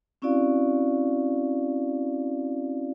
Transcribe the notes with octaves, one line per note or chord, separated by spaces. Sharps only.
C4 C#4 E4 F#4 D5 F5